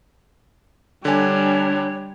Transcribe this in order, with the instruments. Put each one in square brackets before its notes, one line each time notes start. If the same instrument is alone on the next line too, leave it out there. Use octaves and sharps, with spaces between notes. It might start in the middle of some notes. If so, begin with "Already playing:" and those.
[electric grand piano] D3 G#5 [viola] G3 D4 [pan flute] C#5